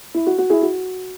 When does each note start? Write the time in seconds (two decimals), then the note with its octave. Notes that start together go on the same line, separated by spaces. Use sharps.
0.14 E4
0.27 F#4
0.38 F#4
0.50 E4 G#4
0.62 F#4